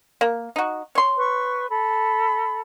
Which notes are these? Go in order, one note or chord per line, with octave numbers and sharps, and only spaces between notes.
A#3
D#4 F#4
C#5 C6
B4 C#6
A4 B5